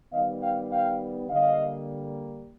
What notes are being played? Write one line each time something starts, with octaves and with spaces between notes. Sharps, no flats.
D#3 G3 B3 D#5 F5
F5 G5
F5 G5
D3 G3 A#3 D#5 F5